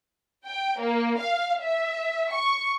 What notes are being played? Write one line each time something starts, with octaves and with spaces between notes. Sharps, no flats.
G5
A#3
F5
E5
C#6